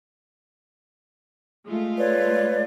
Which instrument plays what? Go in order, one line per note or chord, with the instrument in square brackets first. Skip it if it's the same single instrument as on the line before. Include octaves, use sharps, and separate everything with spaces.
[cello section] G#3 A3 F4
[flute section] B4 C#5 D5